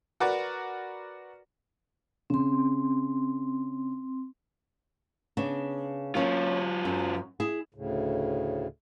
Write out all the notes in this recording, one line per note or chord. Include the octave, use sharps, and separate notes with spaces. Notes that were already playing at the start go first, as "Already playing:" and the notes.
F#4 A#4 B4 D5 F#5
C#3 C4 C6
C#3 B3 D4
F#3 A#3 C#4 F4
F#2
E4 G#4
D2 A2 C#3